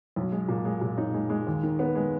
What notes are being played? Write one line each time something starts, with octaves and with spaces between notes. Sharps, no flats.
B1
G#3
A#2
G#3
A#2
D#4
G#3
G#3
D#2
D#3
B3
G#3